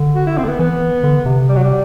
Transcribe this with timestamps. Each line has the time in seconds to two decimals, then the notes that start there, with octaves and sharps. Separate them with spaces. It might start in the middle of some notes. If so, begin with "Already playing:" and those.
Already playing: D3
0.15 F#4
0.27 E4
0.37 C4
0.44 A3
0.48 B3
0.59 E3 B3
1.04 D3
1.26 C3
1.49 G3
1.56 F#3
1.63 G3